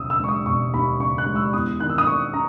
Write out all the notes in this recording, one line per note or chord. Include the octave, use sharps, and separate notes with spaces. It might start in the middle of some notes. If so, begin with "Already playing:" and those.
Already playing: E1 D#2 C#3 D#6 E6
E6
G#3 C#6
D#6
E1 C#6
D#2 B5
C#3 C#6
F#6
G#3
E6
E2 D#6
D#3 F#6
E6
D#6
A#3 C#6
C#4 A#5